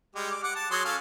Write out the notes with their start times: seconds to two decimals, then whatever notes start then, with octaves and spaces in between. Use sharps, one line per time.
0.15 G3 G#3 G4
0.32 D6
0.44 F#5 D6
0.56 A5
0.71 F#3 G#4 C6
0.85 C#4 A4 F5